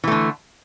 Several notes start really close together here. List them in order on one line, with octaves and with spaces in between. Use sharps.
E3 A3 D3